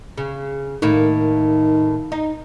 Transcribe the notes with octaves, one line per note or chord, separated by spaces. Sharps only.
C#3
A2 D#3 A#3
D#4